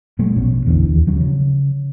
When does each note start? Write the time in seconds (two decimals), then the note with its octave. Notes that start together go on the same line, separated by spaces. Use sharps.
0.19 A#2 F#3 G#3 A3
0.36 A#1 B2 F3 C#4
0.65 A1 E2 D3 E3
0.88 D#2
1.07 F3 F#3 C#4
1.20 C#3